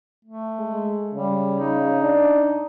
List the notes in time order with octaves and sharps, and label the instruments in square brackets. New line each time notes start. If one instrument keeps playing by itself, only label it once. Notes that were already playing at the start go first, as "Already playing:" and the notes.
[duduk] A3
[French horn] G#3
[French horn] C#3 [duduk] G3
[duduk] D#4
[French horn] D4